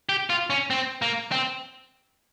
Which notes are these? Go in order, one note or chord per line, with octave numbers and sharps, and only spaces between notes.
G4
F4
C#4
C4
A#3
C4